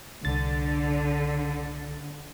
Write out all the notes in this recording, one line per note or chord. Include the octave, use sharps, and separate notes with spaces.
C2 D3 A6